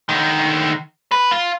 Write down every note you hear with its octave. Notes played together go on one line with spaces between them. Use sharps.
D3 D#3
B4
F4